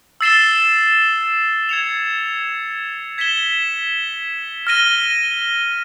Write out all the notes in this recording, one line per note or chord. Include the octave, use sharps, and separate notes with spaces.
E6 A6 C7 E7 G7
G#6 C#7 F7
G#6 B6 E7 G7
F6 A#6 D#7 G7